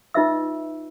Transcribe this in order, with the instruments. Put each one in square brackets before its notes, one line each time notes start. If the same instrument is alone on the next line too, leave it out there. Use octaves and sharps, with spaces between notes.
[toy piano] D#4 F4 B4 D#5 E5 E6